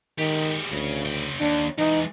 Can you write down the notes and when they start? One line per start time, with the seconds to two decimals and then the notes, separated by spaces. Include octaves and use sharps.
0.18 D#3 G#3 G4
0.71 D2 C#3
1.06 C#3 G5
1.40 D#2 D4
1.78 E3 G#3 D#4